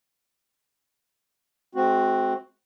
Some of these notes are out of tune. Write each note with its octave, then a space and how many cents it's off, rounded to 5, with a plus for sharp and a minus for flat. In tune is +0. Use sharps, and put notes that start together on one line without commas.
G#3 +40 C4 +0 F#4 +0